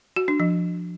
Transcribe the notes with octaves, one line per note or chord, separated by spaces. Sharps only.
F#4
D4
F3